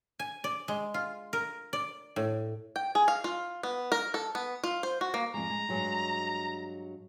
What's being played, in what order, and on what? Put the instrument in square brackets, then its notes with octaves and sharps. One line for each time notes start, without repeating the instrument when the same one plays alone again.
[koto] G#5
D5
G#3
F4
A#4
D5
A2
[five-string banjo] G5
G#4
F5
F4
B3
A#4
A4
B3
F4
C5
F#4
A#3
[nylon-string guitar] F2 G#3 [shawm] A#5
[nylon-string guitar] G#3
G2 F#3 G#3